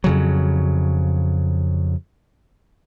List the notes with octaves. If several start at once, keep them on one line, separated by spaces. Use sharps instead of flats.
F2 C#3 F#3